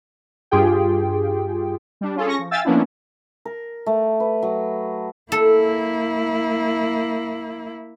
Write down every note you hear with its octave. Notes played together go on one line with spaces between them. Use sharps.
G2 F4 G4 G#4 G5
G3 D4
C#4 F4 G#4 A4
C#4 C#6 A#6
F3
E5 F5 G5 G#5 E6 A6
F3 A#3 B3 C#4 D4 E4
A#4
A3
B4
F#3
A#3 E4 A4